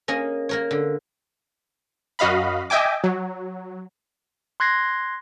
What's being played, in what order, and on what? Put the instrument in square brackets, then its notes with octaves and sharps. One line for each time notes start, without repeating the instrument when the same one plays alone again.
[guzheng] A#3 C#4 G#4 D#5
A#3 A#4 C#5
D3
[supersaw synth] F#2 F#4 D#5 F5 B5
D#5 E5 G5 G#5 D6
F#3
[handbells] C6 F#6 G#6 A#6 C7